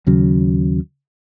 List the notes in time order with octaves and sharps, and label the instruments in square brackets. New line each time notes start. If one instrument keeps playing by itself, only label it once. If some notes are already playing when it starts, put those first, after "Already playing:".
[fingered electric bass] D#2 C#3 F#3